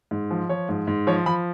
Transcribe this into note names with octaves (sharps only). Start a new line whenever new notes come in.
G#2
F3
F3 C#5
G#2
G#2
F3 C#5
F3 B5